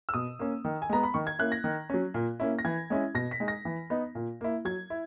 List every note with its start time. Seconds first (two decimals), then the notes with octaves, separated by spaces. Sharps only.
0.09 E6
0.14 B2 D#6
0.39 A#3 C#4
0.65 D#3
0.82 G#5
0.89 G#3 B3 A#5
1.03 B5
1.14 D#3 C#6
1.27 G#6
1.39 A#3 C#4 E4 F#6
1.52 A#6
1.64 D#3
1.90 F#3 C#4
2.14 A#2
2.40 A#3 C#4 E4
2.59 A#6
2.65 E3 G#6
2.90 G#3 C#4 E4
3.15 B2 A#6
3.31 B6
3.40 G#3 D#4
3.48 A#6
3.65 E3
3.90 B3 D#4
4.15 A#2
4.41 A#3 E4
4.65 F#3 G#6
4.90 E4